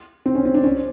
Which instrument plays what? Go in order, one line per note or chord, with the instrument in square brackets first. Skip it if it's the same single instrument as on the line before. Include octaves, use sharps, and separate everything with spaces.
[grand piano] C4
C#4
C4
D4
C#4